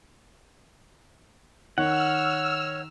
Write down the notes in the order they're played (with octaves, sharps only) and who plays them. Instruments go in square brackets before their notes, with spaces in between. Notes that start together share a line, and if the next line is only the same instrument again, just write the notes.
[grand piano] D#3 [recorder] C#5 [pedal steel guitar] F#5 [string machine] E6 F6